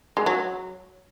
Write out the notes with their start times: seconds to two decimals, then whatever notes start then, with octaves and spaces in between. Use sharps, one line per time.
0.17 G#3
0.26 F#3